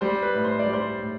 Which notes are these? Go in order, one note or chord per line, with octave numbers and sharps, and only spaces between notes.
G3 C5
B4
A2
C5
D5
G3
C5
A2